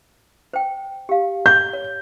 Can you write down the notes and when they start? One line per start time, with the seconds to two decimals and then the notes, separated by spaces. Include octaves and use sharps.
0.53 C5 G5
1.09 G4 F5
1.46 G6
1.73 C#5